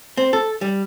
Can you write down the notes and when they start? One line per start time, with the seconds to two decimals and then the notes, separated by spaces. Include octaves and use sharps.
0.17 C4
0.33 A4
0.61 G3